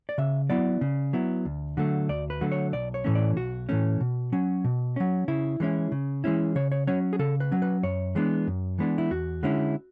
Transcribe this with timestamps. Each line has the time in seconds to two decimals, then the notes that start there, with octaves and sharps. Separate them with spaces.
0.09 D5
0.18 C#3 E5
0.49 F#3 B3 E4 D5
0.81 C#3
1.13 F#3 B3 E4
1.45 D2
1.77 D3 F#3 A3
2.09 D2 D5
2.30 B4
2.41 D3 F#3 A3
2.52 C#5
2.73 B1 D5
2.94 C#5
3.05 A2 E3 A3 C#4
3.15 D5
3.37 B1 F#4
3.69 A2 E3 A3 C#4
4.01 B2
4.32 F#3 C#4
4.64 B2
4.96 F#3 C#4
5.28 C#3 E4
5.60 E3 G#3 C#4 E4
5.92 C#3
6.24 E3 G#3 C#4 E4
6.55 C#3 C#5
6.72 C#5
6.87 F#3 C#4 C#5
7.13 G#4
7.19 C#3 A4
7.40 B4
7.52 F#3 C#4
7.62 B4
7.83 F#2 C#5
8.15 E3 G#3 B3 D4
8.47 F#2
8.79 E3 G#3 B3 D4
8.98 E4
9.10 E2 F#4
9.43 D3 G#3 C#4 E4